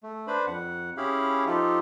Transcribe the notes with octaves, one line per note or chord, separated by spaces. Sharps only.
A3
D4 B4 C5 B5
F2 F#5
C#4 E4 G4 G#4 F5 B5
F3 D#4 F4 G4 A4